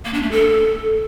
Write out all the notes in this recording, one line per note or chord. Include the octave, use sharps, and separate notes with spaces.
A#3
D4
A3
A4